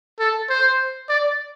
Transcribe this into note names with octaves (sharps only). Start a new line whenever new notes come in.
A4
C5
D5